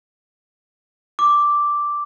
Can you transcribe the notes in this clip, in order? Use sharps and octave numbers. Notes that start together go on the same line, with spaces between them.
D6